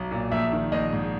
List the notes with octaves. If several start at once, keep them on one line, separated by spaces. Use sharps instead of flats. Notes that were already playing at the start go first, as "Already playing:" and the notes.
Already playing: B1
A#2
A#1 E5
D#3
A#1 D#5
G#2